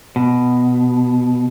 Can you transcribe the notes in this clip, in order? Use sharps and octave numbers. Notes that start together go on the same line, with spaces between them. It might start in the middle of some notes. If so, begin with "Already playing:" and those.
B2